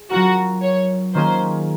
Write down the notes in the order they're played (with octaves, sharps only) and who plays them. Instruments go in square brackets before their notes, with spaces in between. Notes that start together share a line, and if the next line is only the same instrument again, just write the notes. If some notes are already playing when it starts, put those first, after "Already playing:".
Already playing: [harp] G#4
[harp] F#3 C#4 F4 A#4 [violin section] F#4
[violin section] C#5
[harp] D#3 A#3 C#4 F4 G#4 [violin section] C5